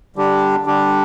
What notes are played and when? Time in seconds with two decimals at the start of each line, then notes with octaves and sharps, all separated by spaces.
0.16 D3 G3 D4 G4
0.66 D3 G3 D4 G4